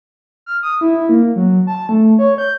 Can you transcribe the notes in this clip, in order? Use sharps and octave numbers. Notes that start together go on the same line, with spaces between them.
F6
D#6
E4
A#3
F#3
A5
A3
C#5
G6